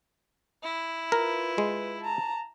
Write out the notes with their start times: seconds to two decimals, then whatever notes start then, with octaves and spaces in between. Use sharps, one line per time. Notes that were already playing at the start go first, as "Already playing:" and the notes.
0.63 E4
1.12 F4 A#4 B4
1.58 G#3
2.01 A5 A#5